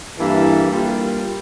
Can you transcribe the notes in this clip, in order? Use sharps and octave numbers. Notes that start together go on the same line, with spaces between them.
G2 E3 A#3 E4 A4
G3 A#3 F4